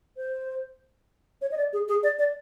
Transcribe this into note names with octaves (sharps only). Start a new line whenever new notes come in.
C5
C#5
D#5
D5
G#4
G#4
D5
D5